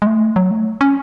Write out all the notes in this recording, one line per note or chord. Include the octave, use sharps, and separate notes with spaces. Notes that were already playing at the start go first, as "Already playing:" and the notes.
G#3
A3
F#3
A3
C#4